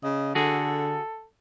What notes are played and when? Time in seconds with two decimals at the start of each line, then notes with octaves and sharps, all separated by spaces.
0.03 C#3 D#5
0.35 D3 F#4 G#4 A4